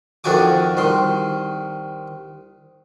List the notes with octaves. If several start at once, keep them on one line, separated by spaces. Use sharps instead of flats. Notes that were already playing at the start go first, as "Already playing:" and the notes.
F2 D#3 D4 F#4 G#5 D6
C2 D#3 C6